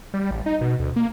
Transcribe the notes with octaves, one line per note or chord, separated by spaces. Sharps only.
G3
A1
D#4
B2
D2
A#3